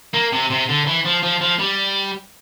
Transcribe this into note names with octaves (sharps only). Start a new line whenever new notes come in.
A#3
C3
C3
D3
E3
F3
F3
F3
G3